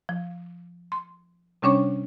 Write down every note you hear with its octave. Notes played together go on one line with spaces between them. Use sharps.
F3
C6
C3 G3 C#4 D4 C#5 C#6